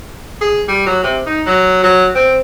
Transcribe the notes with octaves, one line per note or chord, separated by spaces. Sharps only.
G#4
G3
F#3
C3
D#4
F#3
F#3
C4